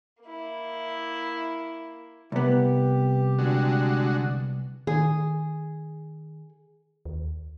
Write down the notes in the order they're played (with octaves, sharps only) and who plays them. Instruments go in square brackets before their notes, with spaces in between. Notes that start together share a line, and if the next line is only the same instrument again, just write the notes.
[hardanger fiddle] A#3 E4
[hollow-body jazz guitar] C2 B3 [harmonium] G4
[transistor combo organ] D3 G#3 F#4
[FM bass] D#3 [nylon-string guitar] G#4
[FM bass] D#2